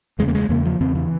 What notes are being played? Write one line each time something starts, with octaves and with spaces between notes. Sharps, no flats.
E2 C#3 G#3
A#3
G#3
E2 C#3 A#3
F3
E2 C#3 C4
E3